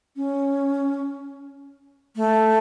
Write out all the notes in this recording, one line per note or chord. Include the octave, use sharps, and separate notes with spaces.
C#4
A3